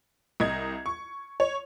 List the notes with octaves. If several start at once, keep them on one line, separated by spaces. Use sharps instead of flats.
C2 D#5 G#6
C#6
C#5